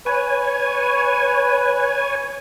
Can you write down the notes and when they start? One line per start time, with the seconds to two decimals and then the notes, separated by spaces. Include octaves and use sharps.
0.06 B4 C#5 G#5